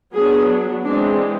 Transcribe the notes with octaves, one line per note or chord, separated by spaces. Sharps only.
F#3 B3 D4 G#4
E3 G#3 C4 D4